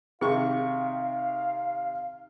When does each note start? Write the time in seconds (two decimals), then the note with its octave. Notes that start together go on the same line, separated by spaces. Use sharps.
0.21 C3 D#3 G#4 F5 C#6